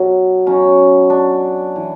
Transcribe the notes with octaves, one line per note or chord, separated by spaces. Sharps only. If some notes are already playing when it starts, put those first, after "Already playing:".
Already playing: B2 F#3
B2 F#3 C#4
D4
E3